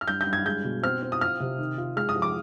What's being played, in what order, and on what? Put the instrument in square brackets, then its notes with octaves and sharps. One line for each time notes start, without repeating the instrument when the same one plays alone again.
[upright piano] F6
G2 G6
G6
G2
G#6
G#3 G6
B2
C4 F6
C4
D#6
F4 F6
C3
D#3
F4
G#3 F6
D#6
F2
D6